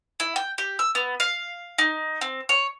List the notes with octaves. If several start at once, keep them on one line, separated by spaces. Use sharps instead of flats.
E4
G5
G4
E6
B3
F5
D#4
C4
C#5